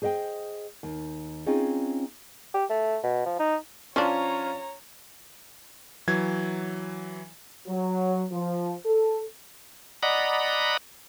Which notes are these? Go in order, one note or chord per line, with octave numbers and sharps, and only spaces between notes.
G#4 C5 D#5 F5 G5
D#2
C4 C#4 D#4 F4 G#4
G4
A3
B2
F3
D#4
F3 C#4 D4 F4 C#5 A#5 C#6
E3 F#3 G#6
F#3
F3
A4
D5 D#5 F#5 A#5 B5